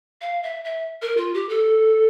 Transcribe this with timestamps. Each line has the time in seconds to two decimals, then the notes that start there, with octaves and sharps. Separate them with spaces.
0.21 F5
0.43 E5
0.64 E5
1.02 A#4
1.17 F4
1.34 G4
1.49 A4